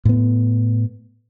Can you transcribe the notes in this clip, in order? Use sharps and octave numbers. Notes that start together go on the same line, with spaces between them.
A2 B3